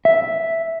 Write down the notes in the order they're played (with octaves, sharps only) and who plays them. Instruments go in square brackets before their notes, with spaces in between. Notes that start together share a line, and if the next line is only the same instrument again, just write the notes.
[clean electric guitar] E5